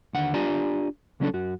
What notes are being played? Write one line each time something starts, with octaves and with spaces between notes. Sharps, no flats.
D#2 D3 F#5
D4 F4 G4 D5 G#5 A#5
C#2 F#3 C#4 D4 A4
F#2 F#4